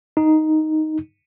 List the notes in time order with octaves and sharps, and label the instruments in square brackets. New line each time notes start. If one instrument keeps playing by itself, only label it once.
[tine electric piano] D#4